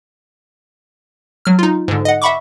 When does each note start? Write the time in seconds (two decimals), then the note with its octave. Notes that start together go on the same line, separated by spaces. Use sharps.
1.45 F#3 F6
1.59 D#4 F4
1.88 G#2 D3
2.05 D#5 F#5
2.22 E5 F#5 B5 C#6 D6